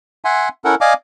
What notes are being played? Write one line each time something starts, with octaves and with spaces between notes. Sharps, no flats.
E5 F#5 G#5 C6
C#4 E4 A4 A#4 F#5
D5 D#5 F5 G#5 D6